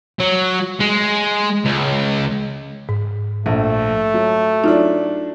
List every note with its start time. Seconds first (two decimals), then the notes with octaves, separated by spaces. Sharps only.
0.20 F#3
0.80 G#3
1.65 C#2
2.89 G#2
3.46 A#1 A3
4.14 F#3
4.64 F#3 D4 D#4 F4